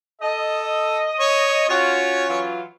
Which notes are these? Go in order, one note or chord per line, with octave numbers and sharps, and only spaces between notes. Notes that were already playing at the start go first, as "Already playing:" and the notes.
A4 D#5
C#5
C#4 F4 F#4 C#5
E3 F#3 F4